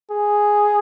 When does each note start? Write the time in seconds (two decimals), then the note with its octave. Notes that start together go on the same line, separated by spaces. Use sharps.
0.11 G#4